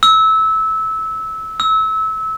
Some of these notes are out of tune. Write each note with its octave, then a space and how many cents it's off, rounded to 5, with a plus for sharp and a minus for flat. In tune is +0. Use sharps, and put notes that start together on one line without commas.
E6 -20
E6 -25